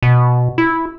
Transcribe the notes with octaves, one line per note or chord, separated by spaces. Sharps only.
B2
E4